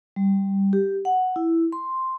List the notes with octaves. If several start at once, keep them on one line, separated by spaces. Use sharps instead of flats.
G3
G4
F#5
E4
C6